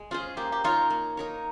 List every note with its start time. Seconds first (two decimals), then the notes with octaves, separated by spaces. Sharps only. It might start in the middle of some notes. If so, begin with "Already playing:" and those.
Already playing: G#3
0.11 C#4 F4 G#4 C5
0.37 A#3 G4
0.52 G4
0.64 D#4 F4 A#4 C#5
0.90 A#3
1.17 D#4 A#4 C#5